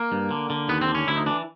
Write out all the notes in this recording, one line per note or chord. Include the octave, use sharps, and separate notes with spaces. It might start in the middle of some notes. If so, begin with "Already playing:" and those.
Already playing: A#3
G2
D3
D3
D#2 B3
C4
D3
C#4
D2 E4
D#4
E3 D4